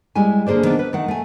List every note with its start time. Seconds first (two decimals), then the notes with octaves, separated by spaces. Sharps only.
0.15 G3 G#3 E4 G#5
0.46 D3 A#3 G#4 C5 D5
0.63 D#3 B3 D4
0.79 B4
0.93 D#3 A3 F#5
1.08 A3 G#5